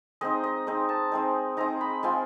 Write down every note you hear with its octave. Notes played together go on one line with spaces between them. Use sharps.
G#3 C4 D#4 D#5
D#5
G#3 C4 D#4
A5
G#3 C4 D#4
G#3 C4 D#4 A#5
B5
G#3 C4 F4 C6